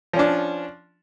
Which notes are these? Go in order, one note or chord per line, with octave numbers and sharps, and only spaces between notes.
F3 C#4 D4